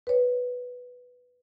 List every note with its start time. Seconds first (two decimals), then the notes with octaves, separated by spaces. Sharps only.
0.07 B4 C#5